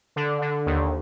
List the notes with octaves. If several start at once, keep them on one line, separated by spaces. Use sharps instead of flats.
D3
D3
D#2